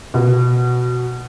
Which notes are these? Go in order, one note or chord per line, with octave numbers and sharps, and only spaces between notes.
B2